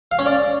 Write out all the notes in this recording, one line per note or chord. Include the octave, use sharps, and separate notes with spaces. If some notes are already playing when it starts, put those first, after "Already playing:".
F5
C#4
D5